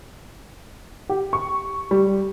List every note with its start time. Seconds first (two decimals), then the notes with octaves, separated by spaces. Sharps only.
1.09 G4
1.33 C#6
1.91 G3